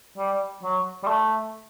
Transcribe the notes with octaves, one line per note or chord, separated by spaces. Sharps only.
G3
F#3
G3
A3